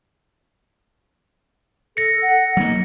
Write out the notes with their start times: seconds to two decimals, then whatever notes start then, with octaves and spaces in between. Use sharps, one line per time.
1.97 A4 A#6 C#7
2.22 F#5
2.57 F#3 A#3 D#4